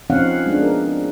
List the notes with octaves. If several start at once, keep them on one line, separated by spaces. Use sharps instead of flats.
F3 C4 C#4 D#4 F5 F#5
G#3 B3 D4 D#4
A#4